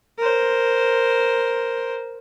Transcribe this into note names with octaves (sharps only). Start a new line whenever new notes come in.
A#4 C5